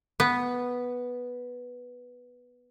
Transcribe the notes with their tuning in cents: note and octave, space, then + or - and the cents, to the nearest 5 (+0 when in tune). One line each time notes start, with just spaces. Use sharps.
B3 -5